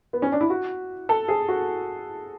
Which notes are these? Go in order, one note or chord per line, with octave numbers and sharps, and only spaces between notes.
B3
C#4
D4
E4
F#4
A4
G#4
F#4